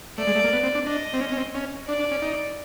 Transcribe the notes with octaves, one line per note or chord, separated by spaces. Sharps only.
A3 D5
G#3
A3
A#3
B3
C4
D4
D4 D#5
C4
C#4
C#4
C4
C#4
D4 D5
D4
C#4
D#4